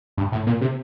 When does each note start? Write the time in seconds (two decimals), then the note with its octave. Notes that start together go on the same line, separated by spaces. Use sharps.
0.17 G2
0.32 A2
0.47 A#2
0.61 C3